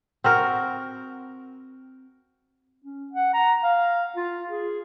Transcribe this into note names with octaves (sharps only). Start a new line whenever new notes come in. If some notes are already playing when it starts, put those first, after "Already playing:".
C4 F#4 A#4
C#4
F#5
A#5
F5
F4
G#4